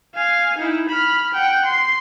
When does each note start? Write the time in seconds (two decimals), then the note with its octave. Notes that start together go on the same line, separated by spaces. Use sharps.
0.15 F5 G#5
0.58 D#4 E4
0.89 B5 F6
1.33 F#5 G5
1.65 C6